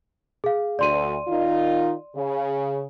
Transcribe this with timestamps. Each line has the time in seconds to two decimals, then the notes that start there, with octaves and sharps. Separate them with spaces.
0.44 G#4 F5
0.79 D2 D5 C6 D#7
1.28 D#3 D#4 F4
2.16 C#3